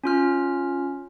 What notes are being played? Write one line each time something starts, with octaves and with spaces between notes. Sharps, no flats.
C#4 F4 F6